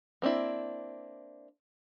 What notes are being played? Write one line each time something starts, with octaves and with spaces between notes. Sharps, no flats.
A#3 C4 D4 E4